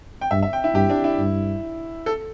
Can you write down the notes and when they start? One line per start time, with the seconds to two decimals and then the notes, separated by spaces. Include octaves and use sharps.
0.21 G5
0.31 G2 E5
0.43 E5
0.53 G5
0.64 E4
0.74 G2 G4
0.90 D4
1.04 E4
1.18 G2
2.06 A4